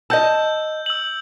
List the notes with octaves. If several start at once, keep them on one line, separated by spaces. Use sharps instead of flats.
D#5 F#5 A5 E6 G6
E6 F#7